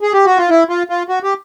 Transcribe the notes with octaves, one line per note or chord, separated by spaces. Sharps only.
G#4
G4
F#4
F4
E4
F4
F4
F#4
G4